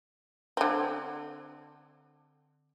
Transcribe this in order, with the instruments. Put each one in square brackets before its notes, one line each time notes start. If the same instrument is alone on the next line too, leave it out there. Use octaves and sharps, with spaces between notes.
[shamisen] D3 C4